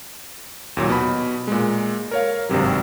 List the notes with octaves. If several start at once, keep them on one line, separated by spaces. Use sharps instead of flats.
D#2 A#2 F#3
B2 B5
A#2 G#3
A#4 C#5 F5
G#1 G2 C3 F#3